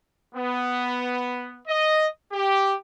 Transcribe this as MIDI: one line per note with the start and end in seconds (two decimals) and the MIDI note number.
0.35 1.59 59
1.68 2.07 75
2.32 2.75 67